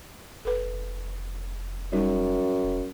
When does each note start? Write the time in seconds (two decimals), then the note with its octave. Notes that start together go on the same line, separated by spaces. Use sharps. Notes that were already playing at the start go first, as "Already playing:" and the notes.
0.45 F1 A4 B4
1.92 F#2 G3 D#4
2.64 E1